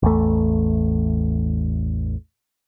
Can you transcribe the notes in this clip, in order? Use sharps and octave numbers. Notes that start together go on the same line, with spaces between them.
A1 E2 A3